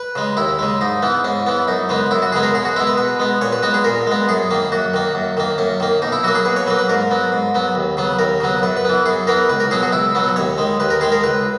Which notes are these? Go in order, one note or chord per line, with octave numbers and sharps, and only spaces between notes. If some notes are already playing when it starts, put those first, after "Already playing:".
Already playing: B4
C#3 G#3
D#2 E4
C#3 G#3
G#2 D#4
E3 B3
G#2 C#4
E3 B3
F#2 D#4
C#3 G#3 B3
F#2 E4
F#4
C#3 G#3 B3 G#4
A#4
B2 G#4
F#4
G#3 B3 E4
B4
B2 B4
G#3 B3
A#2 C#5
B4
G#3 B3 F#4
G#4
A#2 A#4
G#3 B3
F#2 G#4
D#3 A#3
F#2 F#4
D#3 A#3
F#2
D#3 A#3
F#2 C#4
D#3 A#3
B2 D#4
E4
F#3 A#3 F#4
G#4
B2 B4
C#5
F#3 A#3 B4
B4
G#2 A#4
F#3 B3
G#2
F#3 B3
D#2
C#3 F#3 B3
D#2 A#4
C#3 F#3 B3
F#2 B4
B4
E3 B3
F#2 G#4
E3 B3 A#4
C#2 B4
A#4
B2 F#3 B3 G#4
F#4
C#2 E4
B2 F#3 B3
D#2 C#5
D#3 G#3
D#2 B4
A#4
D#3 G#3 G#4
A#4
C#2 B4